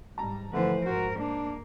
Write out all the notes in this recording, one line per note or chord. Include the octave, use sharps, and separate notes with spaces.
G#2 G3 A5 A#5
D3 E3 F3 A3 B4 C5
G#2 F#4 A#4 C5
A#3 D4